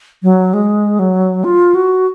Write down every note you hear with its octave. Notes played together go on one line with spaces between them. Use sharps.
F#3
G#3
F#3
F4
F#4